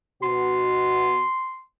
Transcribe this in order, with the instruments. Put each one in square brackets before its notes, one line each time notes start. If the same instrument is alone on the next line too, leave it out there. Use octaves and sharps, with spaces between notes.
[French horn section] B2 F#4 [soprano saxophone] C6